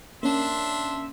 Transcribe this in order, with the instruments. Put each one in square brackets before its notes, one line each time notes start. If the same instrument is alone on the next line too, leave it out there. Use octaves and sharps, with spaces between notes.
[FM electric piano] A#3 C#4 [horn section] D4 E5 C6